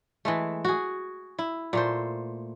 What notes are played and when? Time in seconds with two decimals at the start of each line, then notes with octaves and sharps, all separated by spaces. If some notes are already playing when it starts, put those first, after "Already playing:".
0.25 E3 G#3 A3
0.65 F#4 G#4
1.39 E4
1.73 A#2 A3 C5